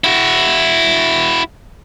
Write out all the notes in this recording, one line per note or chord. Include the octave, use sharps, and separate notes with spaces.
E4 F#4